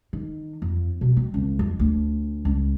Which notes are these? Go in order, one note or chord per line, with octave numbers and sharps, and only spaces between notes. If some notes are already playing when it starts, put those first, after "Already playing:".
D#3
F2
B2
C4
C#2
F2
D2
C#2